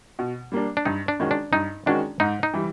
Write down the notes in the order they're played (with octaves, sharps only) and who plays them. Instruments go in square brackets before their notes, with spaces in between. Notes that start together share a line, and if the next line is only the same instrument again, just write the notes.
[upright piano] B2
G3 A#3 D4
[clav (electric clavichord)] D4
[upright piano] G2 [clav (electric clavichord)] D#4
[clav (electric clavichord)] D4
[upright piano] D#3 G#3 C#4 F#4
[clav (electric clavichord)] D4
[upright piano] G2 [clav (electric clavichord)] D#4
[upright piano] D#3 G#3 C#4 F#4 [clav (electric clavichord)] D4
[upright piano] G#2 [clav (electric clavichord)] D#4
[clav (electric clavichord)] D#4
[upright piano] E3 G3